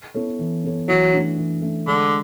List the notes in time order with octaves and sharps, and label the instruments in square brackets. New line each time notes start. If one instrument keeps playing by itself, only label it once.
[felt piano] B3 E4 A4 C#5
E3
B3 E4 A4 C#5
[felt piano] E3 [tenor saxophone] F#3
[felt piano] A3 D4
E3
A3 D4
[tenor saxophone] D3 [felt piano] G#3